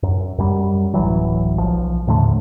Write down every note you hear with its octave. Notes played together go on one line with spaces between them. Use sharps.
F#2
F#2 G3
D1 A1 E3 F#3
B1 F3
D#2 A2 D3 A3